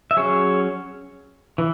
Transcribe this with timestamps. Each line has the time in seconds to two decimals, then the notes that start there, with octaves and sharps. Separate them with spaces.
0.11 E5
0.17 F#3 C#4 G#4 C#5
1.58 E3